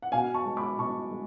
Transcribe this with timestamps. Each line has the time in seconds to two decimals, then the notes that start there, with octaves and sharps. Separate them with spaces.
0.02 F#5
0.12 B2 F5 G#5
0.34 A5 C#6
0.45 G#3
0.57 B5 D6
0.79 B2 A5 C#6
1.11 G#3